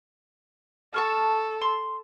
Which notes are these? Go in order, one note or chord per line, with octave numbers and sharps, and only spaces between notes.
A4 A5 C#6 F6
C6